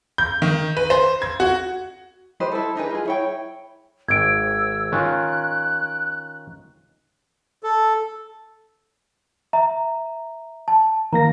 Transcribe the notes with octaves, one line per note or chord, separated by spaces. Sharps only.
G6
D#3
B4
C5
G#6
F#4
G4 B4 C5 D#5
E4 A4
D4 D#4 G#4 B4
F4 G#4
E4 C#5 G5
G#1 E6 G#6 D7
D#3 C#4 F4 F#6
A4
E5 A#5
A5
D#3 A#3 A#5 A#6